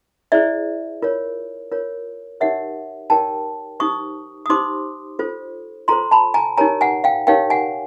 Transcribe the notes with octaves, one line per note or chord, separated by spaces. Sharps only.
E4 G#4 C5 D5 E5
F4 A#4 C#5
F4 A#4 C#5
D#4 G4 A#4 C#5 E5 F#5
D#4 G4 A#4 C#5 G5 A5
D#4 G4 C5 C#6 D#6
D#6
D#4 G4 C5 C6 D6
F4 A4 C5
F4 A4 C5 A#5 C6
A5 B5
G#5 A#5
D#4 G4 A#4 C#5 G#5 A#5
F#5 G#5
F5 G5
D#4 G4 A#4 C#5 F5 G5
F#5 G#5